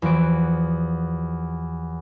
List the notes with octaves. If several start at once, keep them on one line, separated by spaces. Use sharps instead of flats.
E2 F3 F#4 D7